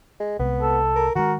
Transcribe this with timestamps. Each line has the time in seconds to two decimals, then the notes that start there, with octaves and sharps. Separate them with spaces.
0.20 G#3
0.39 C2 C3 G#3 B3
0.61 A4
0.96 A#4
1.16 D#3 G#3 F#4 A#4